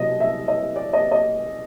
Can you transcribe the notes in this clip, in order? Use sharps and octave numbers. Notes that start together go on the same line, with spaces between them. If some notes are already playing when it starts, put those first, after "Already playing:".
Already playing: C2 B2 F#3 D#5
E5
D#5
D5
D#5
D#5